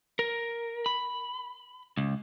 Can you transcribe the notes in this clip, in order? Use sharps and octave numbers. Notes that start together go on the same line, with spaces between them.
A#4
B5
C#2